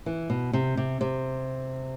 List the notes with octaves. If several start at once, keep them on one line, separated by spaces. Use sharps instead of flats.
E3
B2
C3
C3
C3